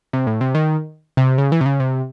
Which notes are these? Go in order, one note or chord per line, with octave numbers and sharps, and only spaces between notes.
C3
A2
C3
D#3
C3
C#3
E3
C3
C#3
C3